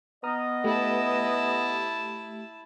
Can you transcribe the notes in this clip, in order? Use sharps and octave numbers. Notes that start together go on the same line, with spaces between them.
B3 D#5 A#5 D#6 F6
A3 E4 G4 A5